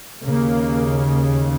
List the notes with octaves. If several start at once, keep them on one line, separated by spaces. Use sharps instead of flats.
D#2 C#3 A#3